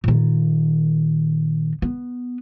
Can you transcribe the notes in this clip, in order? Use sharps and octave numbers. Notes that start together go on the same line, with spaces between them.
A#2 D#3
B3